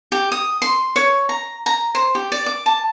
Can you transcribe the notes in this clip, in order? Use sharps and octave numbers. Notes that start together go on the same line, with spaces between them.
G4
D#6
C6
C#5
A#5
A#5
C5
G4
D5
D6
A5